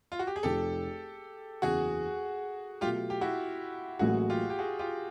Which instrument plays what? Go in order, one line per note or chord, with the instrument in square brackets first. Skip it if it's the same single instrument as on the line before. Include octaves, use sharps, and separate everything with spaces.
[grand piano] F4
F#4
G4
G#4
[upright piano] F1 F2 C3 [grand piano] G4 A4
[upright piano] F#1 E2 C#3 E3 [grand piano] F#4 G#4
[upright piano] B2 F#3 A3 [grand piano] F4 G4
[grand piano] G4
E4 F#4
[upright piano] A1 A2 F#3 A#3 [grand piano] F#4 G#4
[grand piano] F4 G4
G4
F#4 G#4
F4 G4